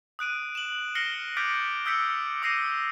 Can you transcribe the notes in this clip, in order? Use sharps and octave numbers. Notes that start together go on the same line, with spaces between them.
D#6 F#6 D7 D#7
E7 F#7
F6 A#6 C7 C#7 F#7 G7
D6 F6 G6 A6 B6 D7
D#6 E6 G6 B6 C#7 D7
D6 D#6 A#6 C7 D#7